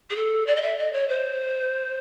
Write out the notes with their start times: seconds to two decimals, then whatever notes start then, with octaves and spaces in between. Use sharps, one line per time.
0.10 G#4
0.15 A4
0.46 D5
0.55 D#5
0.62 E5
0.78 D#5
0.93 C#5
1.08 C5